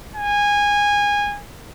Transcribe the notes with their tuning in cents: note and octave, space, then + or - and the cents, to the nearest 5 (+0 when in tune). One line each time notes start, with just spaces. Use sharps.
G#5 -20